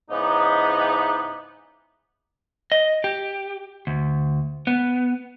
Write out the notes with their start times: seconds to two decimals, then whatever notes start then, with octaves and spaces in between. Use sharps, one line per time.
0.10 G#2 C#3 E3 B3 D4 D#4
2.72 D#5
3.04 G4
3.87 D2
4.67 B3